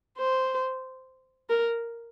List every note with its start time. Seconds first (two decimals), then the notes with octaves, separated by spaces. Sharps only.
0.19 C5
1.49 A#4